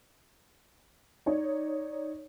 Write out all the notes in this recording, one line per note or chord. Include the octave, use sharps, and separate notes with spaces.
D#4 C#5 D5